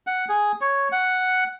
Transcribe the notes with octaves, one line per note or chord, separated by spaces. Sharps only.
F#5
G#4
C#5
F#5